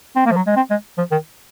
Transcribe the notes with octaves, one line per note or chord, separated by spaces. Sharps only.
C4
A#3
F3
F#3
G#3
C4
G#3
F3
D#3